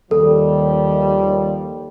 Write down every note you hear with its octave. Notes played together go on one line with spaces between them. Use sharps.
D#2 F3 G3 A4